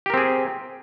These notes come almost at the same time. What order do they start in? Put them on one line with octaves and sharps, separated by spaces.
G4 A#4 C4 G#4